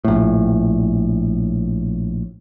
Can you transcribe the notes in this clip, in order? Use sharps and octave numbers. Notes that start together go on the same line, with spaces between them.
A#1 A2